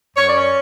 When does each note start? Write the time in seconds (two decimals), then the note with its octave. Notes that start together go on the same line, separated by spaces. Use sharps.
0.16 F#2 C#5
0.27 D5
0.38 C#4 C#5